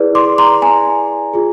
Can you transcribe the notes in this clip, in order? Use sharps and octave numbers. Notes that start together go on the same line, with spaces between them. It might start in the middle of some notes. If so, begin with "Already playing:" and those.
Already playing: E4 G#4 B4 D5
C6 D6
A#5 C6
G#5 A#5
F4 G#4